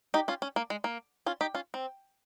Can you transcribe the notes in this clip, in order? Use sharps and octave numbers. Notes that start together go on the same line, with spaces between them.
D#4 G4
C#4 F4
C#4
A#3
G#3
A#3
C#4 F4
D#4 G4
C#4 F4
C4